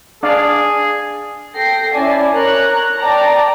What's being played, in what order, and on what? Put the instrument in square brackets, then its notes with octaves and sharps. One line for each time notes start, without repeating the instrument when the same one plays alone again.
[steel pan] D4 D5 F5 [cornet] G#4
[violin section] A4 G5 A#6 C7
C#4 E4 D5 G#5 A5
A#4 C#5 A#5 F#6
D5 G5 A5 A#5